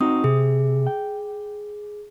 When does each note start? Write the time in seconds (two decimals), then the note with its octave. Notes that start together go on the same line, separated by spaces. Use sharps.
0.01 C4 D#4 F#4 D#6
0.24 C3 G#4
0.87 G5